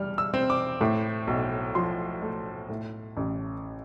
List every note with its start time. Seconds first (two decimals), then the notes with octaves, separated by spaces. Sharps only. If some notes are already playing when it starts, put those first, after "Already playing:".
Already playing: E2 G3 F6
0.18 E6
0.34 C4
0.50 D6
0.81 A2
1.27 B1
1.75 F3 C6
2.22 A3
2.70 A2
3.17 A1